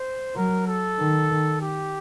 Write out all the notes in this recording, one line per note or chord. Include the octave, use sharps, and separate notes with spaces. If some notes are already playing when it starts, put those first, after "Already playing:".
Already playing: C5
F#3 A#4
A4
D#3
G4